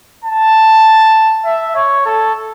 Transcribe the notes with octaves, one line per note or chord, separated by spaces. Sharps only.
A5
E5
C#5
A4